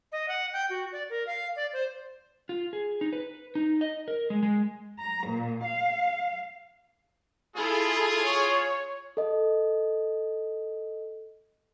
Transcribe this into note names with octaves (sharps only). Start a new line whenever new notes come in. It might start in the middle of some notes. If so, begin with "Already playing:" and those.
D#5
F#5
G5
F#4
D5
A#4
F5
D5
C5
F4
G#4
D#4
B4
D#4
D#5
A#4
G#3
G#3
A#5
A#2
F5
E4 F4 G#4 A4
C#5
A4 D#5